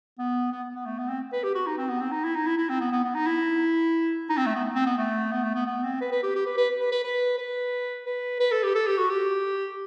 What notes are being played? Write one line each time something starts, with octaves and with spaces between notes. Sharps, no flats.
B3
B3
B3
A3
B3
C4
B4
G4
F#4
D#4
C4
B3
C4
D#4
E4
D#4
E4
E4
C4
B3
B3
B3
D#4
E4
D#4
C4
A3
B3
C4
B3
A3
B3
A3
B3
B3
C4
B4
B4
G4
G4
B4
B4
B4
B4
B4
B4
B4
B4
A4
G4
A4
G4
F#4
G4